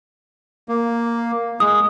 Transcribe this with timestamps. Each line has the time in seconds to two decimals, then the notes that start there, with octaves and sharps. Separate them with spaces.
0.69 A#3
1.60 G#3 D#6